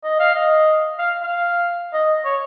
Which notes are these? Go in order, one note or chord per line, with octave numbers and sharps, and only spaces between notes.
D#5
F5
D#5
F5
F5
D#5
C#5